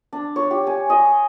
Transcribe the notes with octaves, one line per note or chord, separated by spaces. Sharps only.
D4
C#5
G4
G#5
D#5